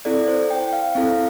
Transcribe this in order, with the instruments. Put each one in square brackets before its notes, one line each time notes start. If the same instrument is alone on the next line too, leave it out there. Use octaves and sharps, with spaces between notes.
[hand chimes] C4 E4 A4 D5
C5
G5
F5
C4 E4 A4 F5